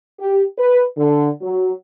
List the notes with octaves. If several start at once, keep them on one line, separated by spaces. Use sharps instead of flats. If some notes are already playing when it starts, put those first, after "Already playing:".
G4
B4
D3
F#3